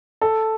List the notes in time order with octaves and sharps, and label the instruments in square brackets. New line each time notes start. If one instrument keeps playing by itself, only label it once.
[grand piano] A4